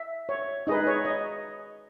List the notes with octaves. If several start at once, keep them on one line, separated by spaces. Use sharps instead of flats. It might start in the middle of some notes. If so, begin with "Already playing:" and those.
Already playing: E5
C#5
D#4 G#4 B4 D#5
C#5
D#5